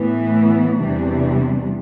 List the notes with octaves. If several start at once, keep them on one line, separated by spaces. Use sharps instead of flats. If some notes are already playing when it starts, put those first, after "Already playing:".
Already playing: A2 E3 B3
E2 C3 E3 G3 D4